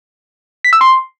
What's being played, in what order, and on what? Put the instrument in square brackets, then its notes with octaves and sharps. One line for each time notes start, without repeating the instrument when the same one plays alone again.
[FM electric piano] B6
E6
C6